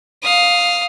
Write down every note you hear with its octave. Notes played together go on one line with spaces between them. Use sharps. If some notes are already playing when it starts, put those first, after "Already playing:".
F5 D#6